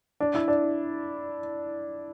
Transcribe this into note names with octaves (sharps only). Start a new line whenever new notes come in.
D4
E4
D4